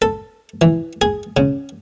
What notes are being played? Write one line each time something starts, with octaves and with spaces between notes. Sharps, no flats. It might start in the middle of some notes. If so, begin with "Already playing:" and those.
A4
E3
G#4
C#3